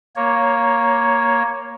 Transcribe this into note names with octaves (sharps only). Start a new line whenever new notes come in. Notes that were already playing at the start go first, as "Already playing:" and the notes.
A#3 C#5